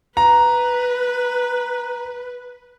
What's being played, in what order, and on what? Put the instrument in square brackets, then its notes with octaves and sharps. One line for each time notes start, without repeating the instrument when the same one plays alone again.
[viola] B4 [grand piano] A#5